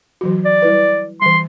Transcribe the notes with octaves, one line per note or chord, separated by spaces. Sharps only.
E3 F#3 F#4
D5
G3 E4 B4
E3 G3 C6